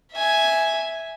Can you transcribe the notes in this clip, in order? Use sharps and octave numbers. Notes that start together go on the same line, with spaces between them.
E5 G#5